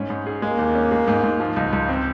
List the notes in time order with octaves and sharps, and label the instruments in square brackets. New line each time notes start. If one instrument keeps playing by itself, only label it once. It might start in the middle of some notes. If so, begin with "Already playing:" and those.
Already playing: [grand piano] G#2 C#4
G#2
G#4
[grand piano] G#3 [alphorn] A#3
[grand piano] D#2
C#4
G#3
G#2
G#2
F3
C#2
C#2
C4